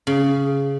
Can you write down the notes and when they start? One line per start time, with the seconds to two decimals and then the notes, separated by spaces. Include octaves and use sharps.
0.07 C#3